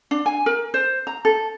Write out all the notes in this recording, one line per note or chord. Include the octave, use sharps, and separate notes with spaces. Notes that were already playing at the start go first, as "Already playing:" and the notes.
D4
G#5
A#4
C5
A#5
A4